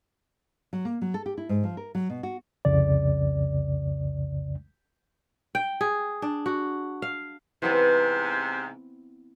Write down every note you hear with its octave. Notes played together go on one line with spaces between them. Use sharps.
F#3
A#3
F#3
A4
G4
E4
G#2
F3
A#4
F#3
B2
F#4
C2 F2 C#3 D5
G5
G#4
D4
F#4
F5
G#2 C3 E3 B3 C4